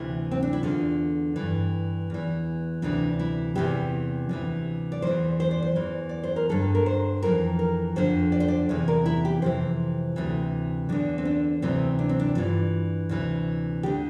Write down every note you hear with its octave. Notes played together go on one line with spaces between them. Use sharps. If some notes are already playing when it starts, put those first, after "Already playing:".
Already playing: D2 C3 E3 E4
C4
D4
E4
E2 D3 F4
G2 E3
E2 E3
D2 C3 E3 D4
E4
E2 C3 E3 G4
D2 C3 E3
D5
E2 E3 C5
C5
D5
C5
E2 E3
D5
C5
A#4
G2 D3 A4
A#4
C5
F2 E3 A#4
A#4
F2 D3 C5
D5
C5
D5
E2 C3 E3
A#4
E4
G4
F2 C3 E3 C5
D2 C3 E3
E2 D3 D4
C4
D4
D2 C3 E3 C4
D4
C4
D4
G2 E3 F4
D2 C3 E3
D2 D3 G4